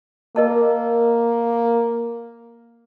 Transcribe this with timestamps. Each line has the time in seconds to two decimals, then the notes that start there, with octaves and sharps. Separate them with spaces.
0.36 A#3 A#4 D#5 A5